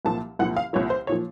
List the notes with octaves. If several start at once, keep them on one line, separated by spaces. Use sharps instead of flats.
C2 A#2 F3 A5
C2 A#2 F3 F#5
F5
C2 A#2 F3 C#5
C5
A#2 F3 C#5